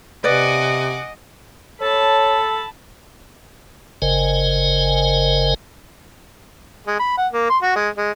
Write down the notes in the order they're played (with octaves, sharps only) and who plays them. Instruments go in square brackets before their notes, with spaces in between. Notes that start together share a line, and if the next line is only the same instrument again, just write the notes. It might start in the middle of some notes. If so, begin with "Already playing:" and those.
[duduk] C3 [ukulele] B4 D5 [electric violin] D#5 [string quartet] F#5 G#5 D6
[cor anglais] A4 [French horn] C#5 [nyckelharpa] A5 B5
[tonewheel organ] G1 C#3 A#4 C5 D#5 G#5
[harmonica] G#3
B5
F#5
A#3
C6
F#4
G#3
G#3